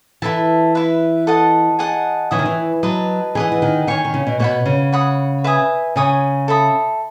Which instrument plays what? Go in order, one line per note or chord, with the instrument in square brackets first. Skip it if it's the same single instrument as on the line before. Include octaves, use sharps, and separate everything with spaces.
[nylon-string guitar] E3 [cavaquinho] E4 A4 E5 A5
[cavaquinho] E4 B4 E5
A4 D#5 F#5 A5
G#4 D#5 F#5 A5
[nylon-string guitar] E3 [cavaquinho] C#5 E5 G#5 D#6
[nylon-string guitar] D#3
E3
[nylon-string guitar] F#3 [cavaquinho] B4 D#5 A5
[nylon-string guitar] E3 [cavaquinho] G#4 D#5 F#5
[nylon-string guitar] E3
D#3
[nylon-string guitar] D#3 [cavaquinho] C#5 G#5 C#6
[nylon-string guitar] D#3
C#3
B2
[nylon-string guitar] B2 [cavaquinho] C#5 F#5 B5
[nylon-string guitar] C#3
[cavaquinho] C#5 F#5 B5 D#6
B4 E5 G#5 D#6
[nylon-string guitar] C#3 [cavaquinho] C#5 G#5 D#6
[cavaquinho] A4 E5 B5 D#6